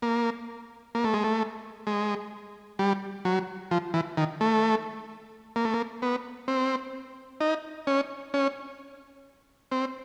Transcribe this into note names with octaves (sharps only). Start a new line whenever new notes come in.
A#3
A#3
A3
G#3
A3
G#3
G3
F#3
F3
E3
D#3
A3
A#3
A3
A#3
B3
C4
D#4
C#4
C#4
C4